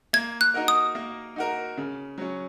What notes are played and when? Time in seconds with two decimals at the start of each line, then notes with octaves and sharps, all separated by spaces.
0.13 A#3 G#6
0.41 F#6
0.54 D#4 F#4 A#4
0.68 D#6
0.95 A#3
1.36 D#4 F#4 A#4
1.77 C#3
2.18 F#3 C#4